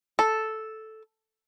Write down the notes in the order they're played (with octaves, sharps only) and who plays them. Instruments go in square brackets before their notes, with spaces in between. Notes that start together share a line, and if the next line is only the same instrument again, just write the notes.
[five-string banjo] A4